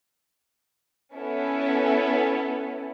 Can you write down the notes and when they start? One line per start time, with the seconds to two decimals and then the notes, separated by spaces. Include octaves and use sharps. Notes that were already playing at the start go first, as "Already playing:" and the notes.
1.14 B3 C#4 E4 A4